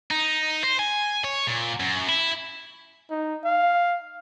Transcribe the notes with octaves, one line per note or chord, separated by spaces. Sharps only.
D#4
C5
G#5
C#5
A#2
F#2
E4
D#4
F5